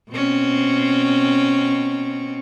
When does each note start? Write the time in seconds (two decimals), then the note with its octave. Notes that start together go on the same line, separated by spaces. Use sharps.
0.11 B2 C4 C#4